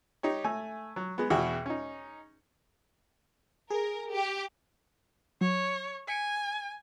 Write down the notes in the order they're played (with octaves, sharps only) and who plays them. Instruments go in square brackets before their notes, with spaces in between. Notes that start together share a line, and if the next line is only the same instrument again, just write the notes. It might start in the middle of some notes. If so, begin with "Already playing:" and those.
[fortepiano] D#4 G4 C#5
A3 G#5
F#3
G#3 B3
E2 B2 E4 F#4 G#4 G5
C#4 D#4
[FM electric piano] G#4 [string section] A#4
[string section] G4
[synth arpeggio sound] F#3 [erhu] C#5
[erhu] G#5 [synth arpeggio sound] B6 C#7 D7